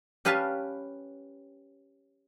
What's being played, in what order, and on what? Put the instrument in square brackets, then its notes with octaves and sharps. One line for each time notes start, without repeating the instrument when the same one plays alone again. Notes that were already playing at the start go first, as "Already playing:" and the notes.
[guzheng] C#4 G4 B4 F5 G#5 A5